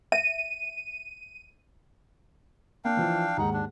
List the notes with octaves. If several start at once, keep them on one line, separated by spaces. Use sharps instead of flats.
E5 D#7
A#3 D4 F5 G5
E3 F3 E4
D#2 G#2 D#4 F#5
D4